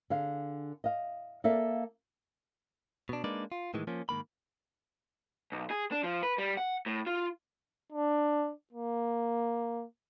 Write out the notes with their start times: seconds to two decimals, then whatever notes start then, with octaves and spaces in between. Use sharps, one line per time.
0.10 D3 G#4 F5
0.84 D#5 F5
1.44 A#3 A4 D5 E5 F5
3.09 B2 D4
3.24 G#3 A#3 D4 D#4 B4 D5
3.52 F4
3.74 A2 D#3 E3 G#3
3.87 F3 A#3 C#4
4.09 G#2 D#3 A#3 B5
5.52 B1
5.71 G#4
5.92 D4
6.03 F3
6.23 B4
6.38 G3
6.57 F#5
6.86 A2
7.07 F4
7.92 D4
8.73 A#3